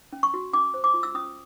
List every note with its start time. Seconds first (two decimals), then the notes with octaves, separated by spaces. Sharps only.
0.13 C#4
0.23 C#6
0.34 F#4
0.53 C#4 D6
0.74 C5
0.84 D6
0.94 F4
1.03 E6
1.15 C#4 D#6